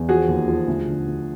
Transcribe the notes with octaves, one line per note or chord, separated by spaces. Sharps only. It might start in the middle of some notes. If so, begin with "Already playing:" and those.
Already playing: E2
F3 F#4 G#4
D#2
F3
D2
D3
D2